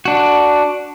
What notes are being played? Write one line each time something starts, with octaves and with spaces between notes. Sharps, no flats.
D4 F#4